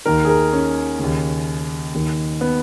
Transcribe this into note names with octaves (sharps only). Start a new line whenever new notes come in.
D#2 D#3 A#4
G#4
A#4
C#4
D#2 C#3
D#2 D#3
B3